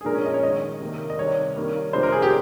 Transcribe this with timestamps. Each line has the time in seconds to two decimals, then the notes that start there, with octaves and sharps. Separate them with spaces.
0.01 G#4
0.05 A#2 F3 G#3 A#4
0.14 C#4
0.26 D#5
0.34 C#5
0.43 D#3 G#3 D#5
0.80 C3 D#3 A#3
1.10 D#5
1.18 C3 D#3 G3 C#5
1.56 D#3 G3 A#3
1.93 C3 F3 A#3 C5
2.03 A#4
2.12 G#4
2.22 G4